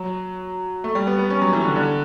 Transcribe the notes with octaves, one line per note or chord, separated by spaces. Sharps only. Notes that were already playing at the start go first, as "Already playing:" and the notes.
Already playing: F#3
A3
G3
B3
B3
C#4
F#3
E3
D3
D3